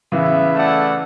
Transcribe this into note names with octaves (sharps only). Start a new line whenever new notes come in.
C#3 E3 B3 E4 B4 E5
A3 E4 A4 D5 F#5